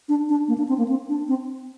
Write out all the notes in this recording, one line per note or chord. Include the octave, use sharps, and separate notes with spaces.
D4
D4
A#3
D4
C4
A#3
C4
D4
C4